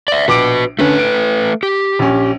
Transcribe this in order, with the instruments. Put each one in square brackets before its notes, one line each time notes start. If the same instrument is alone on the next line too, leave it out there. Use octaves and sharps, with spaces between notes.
[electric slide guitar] D5 E5
[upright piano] A#1 D6 D7 [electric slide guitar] F#4 B4
[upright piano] D3 C#4 [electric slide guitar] A3 B4
[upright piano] D7
[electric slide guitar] G4
[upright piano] A#1 C#4